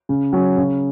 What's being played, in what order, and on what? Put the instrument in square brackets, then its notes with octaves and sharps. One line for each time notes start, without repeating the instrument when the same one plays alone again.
[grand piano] C#3
F#3 C#4
C#3